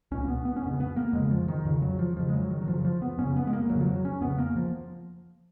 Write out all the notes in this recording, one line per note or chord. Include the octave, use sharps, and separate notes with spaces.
C#2 B2 C#4
A#3
B3
B3
C#4
F2 C#3 B3
B3
A#3
F2 C#3 G#3
F3
D#3
F2 C#3
F#3
F3
F2 C#3 F3
G#3
F#3
D#3
F#3
F#2 C#3 F3
F3
B3
F#2 C#3 C#4
B3
G#3
A#3
F2 C#3 F#3
F3
F#3
C#4
F2 C#3 B3
A#3
F3